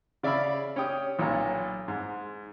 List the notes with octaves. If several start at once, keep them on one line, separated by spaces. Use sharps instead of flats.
C#3 D5 E5 F5 B5
C#4 G4 G5 D#6
B1 A#2 C#5 A#5
G#2